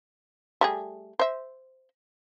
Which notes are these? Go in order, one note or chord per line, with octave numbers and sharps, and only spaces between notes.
G3 A3 G#4
C5 E5